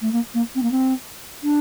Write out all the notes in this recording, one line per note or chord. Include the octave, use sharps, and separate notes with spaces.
A3
A#3
A#3
C4
A#3
C4
D4